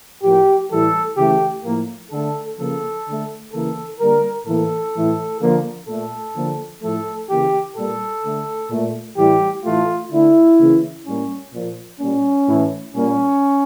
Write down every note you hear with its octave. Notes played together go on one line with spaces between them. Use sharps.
A2 F3 A#3 G4
A2 E3 G3 A4
C#3 E3 A3 G4
A2 F3 A#3
D3 A3 A4
C#3 F3 A#3 A4
D3 A3
C#3 E3 A#3 A4
D3 G3 A#3 A#4
A2 E3 A#3 A4
A2 E3 A3
D3 F3 A#3
A#2 A3 A4
D3 F3 A#3
A2 F3 A3 A4
C#3 E3 A#3 G4
A#2 G3 A#3 A4
D3 A3
A#2 A3
A2 E3 G3 G4
A2 E3 A3 F4
D3 A3 E4
C#3 E3 A#3
A2 G3 A#3 C#4
A#2 F3 A#3
A#2 G3 A#3 C#4
A2 E3 A3
A#2 G3 A#3 C#4